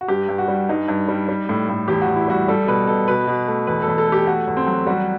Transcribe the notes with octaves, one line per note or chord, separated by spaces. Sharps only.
F#4
G2 G4
G2
F#4
G3
G2 D#4
G2
G3
G3
A2
A2
E2 G4
F#4
E2
E4
G3 F#4
G3 A4
B2 B4
B2 A4
B2 B4
B2
A3
E2 B4
A4
E2
A4
A3 G4
A3 F#4
E2
C4
F#3
G3 F#4